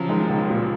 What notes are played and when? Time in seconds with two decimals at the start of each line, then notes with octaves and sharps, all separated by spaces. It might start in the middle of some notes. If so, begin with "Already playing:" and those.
Already playing: C#3 F3 F#3
0.09 D#3 G#3
0.29 C#2
0.50 A#2